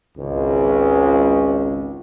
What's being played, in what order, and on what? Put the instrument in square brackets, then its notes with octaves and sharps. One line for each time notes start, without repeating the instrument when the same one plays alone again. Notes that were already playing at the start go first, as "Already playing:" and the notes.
[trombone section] G#1 C#2